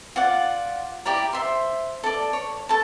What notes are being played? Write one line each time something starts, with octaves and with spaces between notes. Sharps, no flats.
F4 D5 F#5
E4 G4 D5 A#5
C5 E5 C6
A4 D5
C#5
A4 A5